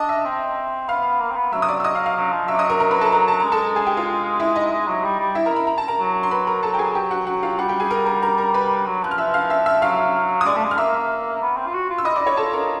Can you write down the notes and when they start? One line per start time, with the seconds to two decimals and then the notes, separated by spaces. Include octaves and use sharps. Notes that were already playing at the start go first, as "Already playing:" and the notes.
Already playing: D4 D#5 D#6
0.09 E5 E6
0.25 C4
0.89 B3 F5 F6
1.20 A#3
1.31 C4
1.36 B3
1.52 F#3 E5 E6
1.62 D#6
1.68 D5 D6
1.80 E6
1.84 D#5 D#6
1.95 F5 F6
2.06 F5 F6
2.17 F#3
2.32 F3
2.48 F#3 E5 E6
2.55 D6
2.59 D#5 D#6
2.70 A#4 A#5
2.80 A#4 A#5
2.91 B4 B5
3.01 A4 A5
3.12 A#4 A#5
3.28 A5
3.40 G#3 A#5
3.52 A4 A5
3.76 G#4 G#5
3.86 G4 G5
3.97 F4 F5
4.40 E4 E5
4.56 D#4 D#5
4.71 G#3
4.88 F#3
5.04 G3
5.20 G3
5.35 E4 E5
5.46 A#4 A#5
5.56 B5
5.67 A#5
5.78 A5
5.88 A#4 A#5
5.99 F#3
6.23 C6
6.31 B4 B5
6.47 A#4 A#5
6.63 F#3 A4 A5
6.74 G5
6.79 G#4 G#5
6.95 G4 G5
7.11 F#4 F#5
7.26 F#3 F#4 F#5
7.43 F4 F5
7.59 G3 F#4 F#5
7.69 G4 G5
7.80 G#4 G#5
7.90 A#4 A#5
8.06 A#4 A#5
8.22 A#4 A#5
8.38 A#4 A#5
8.54 B4 B5
8.86 F#3
9.03 F3 F#6
9.11 F6
9.18 F3 E5 E6
9.34 F5 F6
9.50 E5 E6
9.66 E5 E6
9.82 F#3 F5 F6
10.41 D#6
10.45 G#3 D5 D6
10.56 A3
10.64 G#3
10.71 F6
10.77 A#3 E5 E6
11.42 B3
11.57 C4
11.66 F4
11.74 F#4
11.90 F4
11.98 E6
12.05 E4 D#5 D#6
12.16 E4 D5 D6
12.26 C#5 C#6
12.37 F4 A4 A5
12.53 A#4 A#5